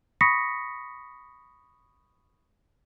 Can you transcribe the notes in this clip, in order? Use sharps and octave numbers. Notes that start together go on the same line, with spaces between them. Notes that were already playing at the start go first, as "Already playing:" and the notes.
B5 C#6 D#6 A#6 B6 C#7